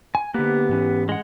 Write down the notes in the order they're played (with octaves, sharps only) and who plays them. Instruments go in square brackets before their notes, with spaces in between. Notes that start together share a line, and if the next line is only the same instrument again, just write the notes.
[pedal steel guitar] G#5
[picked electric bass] D3 A#3 [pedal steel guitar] B3 G4 F#6
[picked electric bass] G#2 E3 C#4
[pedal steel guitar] G#3 F#5